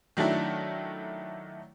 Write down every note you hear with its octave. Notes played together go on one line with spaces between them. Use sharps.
D#3 F#3 A3 D4 E4